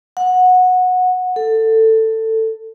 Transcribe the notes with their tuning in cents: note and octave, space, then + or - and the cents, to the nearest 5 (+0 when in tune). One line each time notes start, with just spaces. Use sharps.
F#5 -15
A4 +15